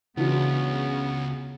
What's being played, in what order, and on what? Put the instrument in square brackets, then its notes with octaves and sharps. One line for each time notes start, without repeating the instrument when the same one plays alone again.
[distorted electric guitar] C#2 [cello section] C#3 [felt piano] E3 D4 F#4 [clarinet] B3